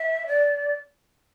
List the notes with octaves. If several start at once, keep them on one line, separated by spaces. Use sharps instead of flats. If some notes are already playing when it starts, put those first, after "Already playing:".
Already playing: E5
D5